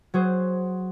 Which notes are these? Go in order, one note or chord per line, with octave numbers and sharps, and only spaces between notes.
F#3 F#4 G#4 C5